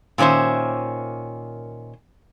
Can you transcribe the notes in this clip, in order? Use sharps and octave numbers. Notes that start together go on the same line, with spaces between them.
A#2 D#3 C#4 C5 E5